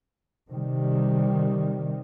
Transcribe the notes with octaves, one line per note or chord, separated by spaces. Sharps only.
C3 D#3 G3